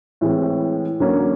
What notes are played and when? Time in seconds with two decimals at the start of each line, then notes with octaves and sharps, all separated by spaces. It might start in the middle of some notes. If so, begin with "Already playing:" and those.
0.21 A2 E3 G#3 C4
1.00 D3 F#3 A#3 C#4